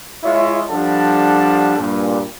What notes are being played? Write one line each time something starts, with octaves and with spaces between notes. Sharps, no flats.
G#3 E4 F4 C#5 D#5 E5
F3 G3 D4 A4 F#5 A5
G2 A#2